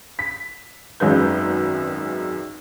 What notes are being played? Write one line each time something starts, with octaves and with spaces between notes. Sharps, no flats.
B6
G#1 F#2 D#3 G#3 B4 G6